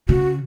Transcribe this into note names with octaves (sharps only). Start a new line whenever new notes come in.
C#3 F#4